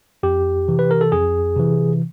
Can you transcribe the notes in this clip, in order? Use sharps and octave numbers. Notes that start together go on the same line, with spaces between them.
F2 G4
C3 E3
B4
A#4
A4
F2 G#4
C3 E3